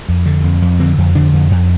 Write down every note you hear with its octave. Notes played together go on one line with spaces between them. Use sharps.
F2
D3
F2
F2
D3 C4
F2
D3 D4
F2
F2